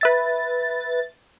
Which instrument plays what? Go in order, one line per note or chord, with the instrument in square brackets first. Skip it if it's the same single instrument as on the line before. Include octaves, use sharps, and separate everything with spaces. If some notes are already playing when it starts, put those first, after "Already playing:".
[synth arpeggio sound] B4 E5 A6